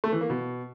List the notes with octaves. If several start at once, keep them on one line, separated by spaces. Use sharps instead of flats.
A3
E3
A#3
B2